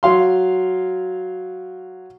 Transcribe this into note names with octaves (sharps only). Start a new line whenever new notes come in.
F#3 F5 C6